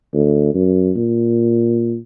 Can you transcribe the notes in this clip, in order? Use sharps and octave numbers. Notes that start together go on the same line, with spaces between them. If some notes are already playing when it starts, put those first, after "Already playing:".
D2
F#2
A#2